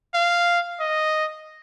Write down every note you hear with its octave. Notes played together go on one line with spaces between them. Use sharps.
F5
D#5